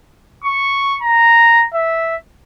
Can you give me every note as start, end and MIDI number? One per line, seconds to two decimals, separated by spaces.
0.45 0.97 85
1.03 1.66 82
1.74 2.16 76